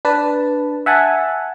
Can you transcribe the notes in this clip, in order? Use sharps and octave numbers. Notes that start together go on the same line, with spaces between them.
D4 B4 A5
E5 F#5 G#5 A5